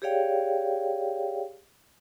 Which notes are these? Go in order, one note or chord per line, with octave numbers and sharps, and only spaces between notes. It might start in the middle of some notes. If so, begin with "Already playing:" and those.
G4 G#4 C#5 D5 F5 G5